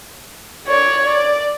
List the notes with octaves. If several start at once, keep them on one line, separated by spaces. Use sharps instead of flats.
C#5 D5
D5